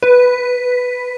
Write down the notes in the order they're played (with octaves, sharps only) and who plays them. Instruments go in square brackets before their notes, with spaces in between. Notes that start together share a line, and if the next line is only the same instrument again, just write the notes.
[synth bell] B4